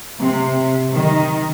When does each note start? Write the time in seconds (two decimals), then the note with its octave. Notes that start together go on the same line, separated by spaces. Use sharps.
0.19 C3
0.93 D#3